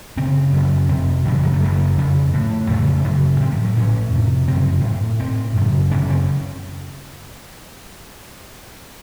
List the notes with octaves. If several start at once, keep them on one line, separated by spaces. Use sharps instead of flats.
F#2 C#3 C4
F#2 C#3
F2 C3 C4
F#2 C#3
F3
F#3
A3
F#2 C#3 A#3
F2 C#3
A2
F2 C#3 A3
F#2 C#3
A2 C4
F3
F#3
A2 C#4
F2 C3
F#2 C#3 C4
A2
A2 C4
F#2 C#3
F#2 C#3 C#4
C4